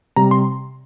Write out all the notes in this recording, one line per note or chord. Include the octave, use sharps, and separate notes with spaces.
C3 G3 A#5
C6